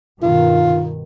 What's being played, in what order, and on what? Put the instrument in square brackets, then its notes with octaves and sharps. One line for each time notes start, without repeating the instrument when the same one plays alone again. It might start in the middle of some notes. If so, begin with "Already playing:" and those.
[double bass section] G2 B2 D#3 [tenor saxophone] F4